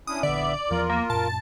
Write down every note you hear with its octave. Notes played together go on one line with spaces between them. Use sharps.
C#4 D4 E4 D#6
A#1 E2 D3 B3 D5 E5
E2 F3 F4 A#4
A#3
F#2 A#2 A5